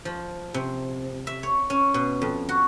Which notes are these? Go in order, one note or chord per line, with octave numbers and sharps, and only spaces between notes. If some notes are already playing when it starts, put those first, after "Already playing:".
F3
C3
E5
C#5
C#4
B2
F2
F#4